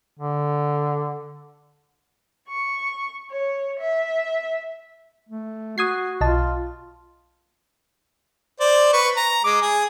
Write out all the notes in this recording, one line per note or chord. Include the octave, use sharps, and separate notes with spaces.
D3
C#6
C#5
E5
A3
F#4 D#6 G#6 C7
B1 F4 D#5 A5
C5 D5
B4 C#6
A#5
G#3 D6
G#4